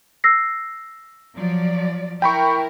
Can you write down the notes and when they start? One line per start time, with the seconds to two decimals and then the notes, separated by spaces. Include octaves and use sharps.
0.24 E6 A#6 C7
1.35 F3 F#3 D5
2.22 E4 A#4 G5 B5 C#6